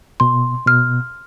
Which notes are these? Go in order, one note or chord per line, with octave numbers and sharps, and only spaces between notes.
B2 C6
B2 F6